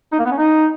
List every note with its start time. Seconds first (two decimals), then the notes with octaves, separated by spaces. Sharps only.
0.13 D#4
0.19 A#3
0.25 B3
0.31 C#4
0.38 D#4